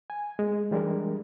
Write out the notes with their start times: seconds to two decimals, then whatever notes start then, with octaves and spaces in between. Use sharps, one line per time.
0.10 G#5
0.39 G#3
0.71 E3 G3 G#3 D4 A#4